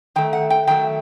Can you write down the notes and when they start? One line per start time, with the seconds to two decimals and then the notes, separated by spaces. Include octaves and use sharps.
0.16 D#3 A3 G5
0.33 F#5
0.50 G5
0.67 D#3 F#3 A3 G5